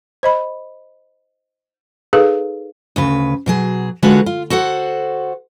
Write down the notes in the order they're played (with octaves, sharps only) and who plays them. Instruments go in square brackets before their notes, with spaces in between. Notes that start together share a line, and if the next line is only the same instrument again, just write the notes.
[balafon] C5 D#5 B5
D#4 G#4 A4 B4 F5
[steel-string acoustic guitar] D2 C#3 B4
B2 F#3 G#4
D3 G#3 F4 F#4 A4 B4
F4
F#4 A4 C5 F#5